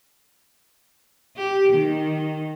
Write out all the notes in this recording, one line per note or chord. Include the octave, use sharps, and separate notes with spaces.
G4
D#3